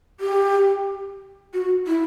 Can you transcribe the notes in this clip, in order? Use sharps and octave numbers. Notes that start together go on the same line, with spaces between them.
G4
F#4
E4